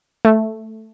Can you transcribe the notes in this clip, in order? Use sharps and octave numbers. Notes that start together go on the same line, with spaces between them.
A3